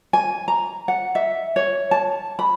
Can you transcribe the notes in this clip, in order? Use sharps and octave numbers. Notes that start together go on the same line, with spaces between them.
G#5
A#5
F#5
E5
C#5
A5
B5